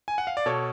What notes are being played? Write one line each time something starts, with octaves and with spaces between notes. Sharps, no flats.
G#5
F#5
F5
D5
B2 A4 C#5